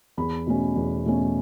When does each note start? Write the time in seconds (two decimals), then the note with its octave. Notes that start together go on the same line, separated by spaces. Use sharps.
0.17 E2 B5
0.47 B2 A3 C#4
0.76 E2
1.05 B2 A3 C#4